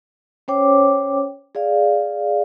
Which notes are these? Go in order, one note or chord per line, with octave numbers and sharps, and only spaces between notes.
C#4 C5 C#5 G5 D6
G#4 D5 F5